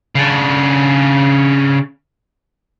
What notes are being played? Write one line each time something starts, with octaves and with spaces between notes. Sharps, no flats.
C#3 D4